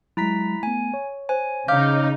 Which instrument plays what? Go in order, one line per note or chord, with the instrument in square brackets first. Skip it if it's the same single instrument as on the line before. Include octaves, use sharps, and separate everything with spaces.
[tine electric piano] F#3 G#3 [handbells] E4 A#5 B6
[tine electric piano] A3 B3 [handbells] G#5
[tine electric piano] C#5
[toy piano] C5 [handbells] G#5
[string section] C#3 D#4 [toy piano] F5 [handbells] D6 F6 G6